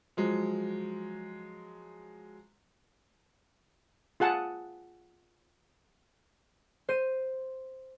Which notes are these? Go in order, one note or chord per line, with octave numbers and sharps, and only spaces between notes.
F3 F#3 G#3
F4 G#4 F#5 A5
C5 D#7